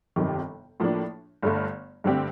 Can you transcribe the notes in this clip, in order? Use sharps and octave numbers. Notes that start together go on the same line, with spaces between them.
G1 F2 C3 D#3
A2 F3 A#3 D4
G1 G2 D3 A3
G2 D3 A3 C4 G4